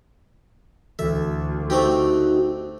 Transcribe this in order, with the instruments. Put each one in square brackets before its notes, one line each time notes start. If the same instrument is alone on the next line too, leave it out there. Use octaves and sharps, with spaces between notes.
[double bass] D2 [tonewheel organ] E3 A4 [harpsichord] E5
[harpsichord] A3 C4 G4 [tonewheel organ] D#4 F#4